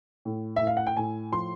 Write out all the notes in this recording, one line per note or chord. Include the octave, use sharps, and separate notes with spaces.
A2
A2 E5
F5
F#5
G5
A2 G#5
F3 C6